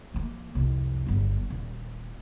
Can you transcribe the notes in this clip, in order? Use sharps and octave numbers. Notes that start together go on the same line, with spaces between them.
F3 A#3
C2 F2
G1 F#3
D#1